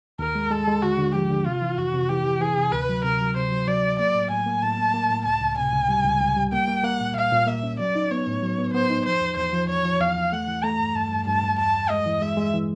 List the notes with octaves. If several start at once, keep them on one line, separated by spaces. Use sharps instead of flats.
D#2 A#4
G#3
G#3 A4
G#3
D3 F#4
D3
F3 G4
D3
C3 F4
E3
F2 F#4
C3
E3 G4
E3
E3 G#4
C3
D2 B4
F#3
C3 A#4
F#3
C3 C5
F#3
F#3 D5
F#3
A#3 D5
A2
A2 G#5
A#3
A2 A5
A#3
A#3
A2
C#2 A5
C#2
C3 G#5
C#2
G3
C#2
C#2
G3
A#3 G5
A#3
A#3 F#5
A#2
A#2 F5
A#2
A#3 E5
C#4
F#3 D5
D#4
B3 C#5
A2
F#3
B3
B3 C5
D#4
F3 C5
E2
E2 C5
F3
E2 C#5
F3
E2 F5
E2
A3 F#5
E3
A3 A#5
G2
G2 A5
G2
G2 A5
G2
E2 A5
E2
G#3 D#5
E3
G#3 E5
G#3
E3